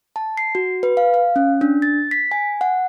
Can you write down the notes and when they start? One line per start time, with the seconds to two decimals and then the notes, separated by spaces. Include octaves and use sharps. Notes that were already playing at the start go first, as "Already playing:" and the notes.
0.16 A5
0.37 C7
0.55 F#4
0.83 B4
0.97 F5
1.14 F5
1.36 C#4
1.61 D4
1.82 A6
2.11 B6
2.32 G#5
2.61 F#5